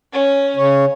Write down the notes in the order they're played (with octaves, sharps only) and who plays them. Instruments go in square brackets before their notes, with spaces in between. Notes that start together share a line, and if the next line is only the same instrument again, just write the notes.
[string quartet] C#4
[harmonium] C#3 C#5